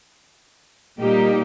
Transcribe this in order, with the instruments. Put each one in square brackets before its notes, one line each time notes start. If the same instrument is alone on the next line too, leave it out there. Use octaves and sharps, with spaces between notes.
[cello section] A#2 G3 A#3 D#4 G4